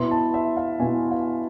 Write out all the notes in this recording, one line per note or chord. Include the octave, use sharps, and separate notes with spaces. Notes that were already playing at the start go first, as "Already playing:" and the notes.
Already playing: B2 B3 E4 C6
A5
E5
F5
B2 B3 E4 G#5
F5